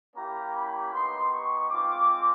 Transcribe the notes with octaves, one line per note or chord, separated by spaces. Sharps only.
A#3 C#4 E4 G4 A#5
B5
B3 D#4 G4 C6
C#6
G#3 C4 F4 D6